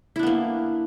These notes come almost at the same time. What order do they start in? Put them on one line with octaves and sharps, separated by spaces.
E4 D4 B3 A#3